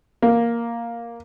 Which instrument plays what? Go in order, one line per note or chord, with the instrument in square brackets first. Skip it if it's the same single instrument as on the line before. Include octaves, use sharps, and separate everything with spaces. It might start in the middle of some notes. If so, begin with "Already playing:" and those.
[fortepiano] A#3